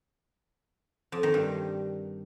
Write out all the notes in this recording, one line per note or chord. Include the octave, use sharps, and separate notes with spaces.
F2
D#3
G2